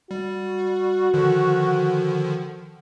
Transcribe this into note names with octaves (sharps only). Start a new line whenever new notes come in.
G3 F#4
D3 D#3 F3